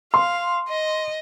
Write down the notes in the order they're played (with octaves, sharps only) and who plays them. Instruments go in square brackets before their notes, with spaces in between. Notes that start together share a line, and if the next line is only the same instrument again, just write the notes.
[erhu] F5 [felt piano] C6
[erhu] D#5